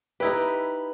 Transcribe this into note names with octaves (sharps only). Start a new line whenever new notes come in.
D#4 E4 G4 B4